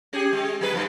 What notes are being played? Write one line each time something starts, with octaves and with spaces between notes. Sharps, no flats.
C#4 G4 G#4
G#3
F#3 G#4 B4
G2 B2 F3